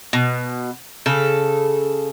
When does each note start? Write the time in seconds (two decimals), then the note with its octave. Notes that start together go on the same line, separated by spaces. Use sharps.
0.13 B2
1.06 C#3 A4